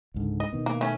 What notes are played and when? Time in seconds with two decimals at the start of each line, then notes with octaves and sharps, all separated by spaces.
0.14 C#2 G#2 D3
0.40 D#5
0.53 B2 D#3 B3
0.66 A#3
0.81 A3 C#4